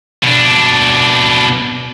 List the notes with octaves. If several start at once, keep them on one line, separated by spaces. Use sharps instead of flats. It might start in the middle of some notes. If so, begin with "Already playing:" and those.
B2 D4